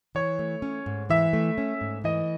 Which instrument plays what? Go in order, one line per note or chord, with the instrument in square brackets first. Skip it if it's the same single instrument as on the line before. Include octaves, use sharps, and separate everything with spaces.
[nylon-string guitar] E3 [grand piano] C#5
[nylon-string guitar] A3
C#4
G#2
[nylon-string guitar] E3 [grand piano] E5
[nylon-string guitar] A3
C#4
G#2
[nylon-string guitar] E3 [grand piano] D#5